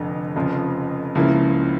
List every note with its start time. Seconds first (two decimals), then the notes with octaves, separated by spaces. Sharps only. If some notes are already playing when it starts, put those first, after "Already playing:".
Already playing: F1 F2 D3
0.36 F1 F2 C#3 F3
1.15 C#2 C#3 F3 A#3 E4